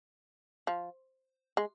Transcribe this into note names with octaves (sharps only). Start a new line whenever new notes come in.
F3
G#3